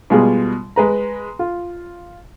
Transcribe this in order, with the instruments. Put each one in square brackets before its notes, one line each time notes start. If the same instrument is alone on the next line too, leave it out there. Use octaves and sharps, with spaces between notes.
[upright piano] B2 G3 G#3 F4 G#4
G#3 B4 A#5
F4